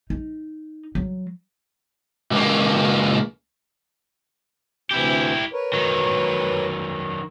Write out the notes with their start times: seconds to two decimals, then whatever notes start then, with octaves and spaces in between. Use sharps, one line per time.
0.10 D#4
0.95 F#3
2.31 C#2 A#3
4.91 D2 C3 E3 E4 G4
5.53 A#4 B4 C#5
5.73 D#3 F#3